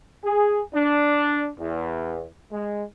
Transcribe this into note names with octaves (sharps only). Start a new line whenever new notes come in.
G#4
D4
E2
G#3